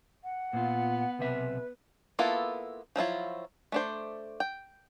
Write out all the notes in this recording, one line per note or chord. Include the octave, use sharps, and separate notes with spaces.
F#5
A#2 B3 F4
B1 C3 B4 E5
A#3 B3 E4 F4 A4
F3 F#3 E4 F4
A3 D4 C5
G5